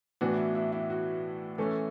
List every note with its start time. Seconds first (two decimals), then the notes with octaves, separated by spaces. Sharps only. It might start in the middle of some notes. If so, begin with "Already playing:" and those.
0.21 A2 E3 B3 D4 F#4
0.34 E4
0.38 F#4
0.55 E4
0.72 E4
0.90 F#4
1.58 E3 A3 C#4 A4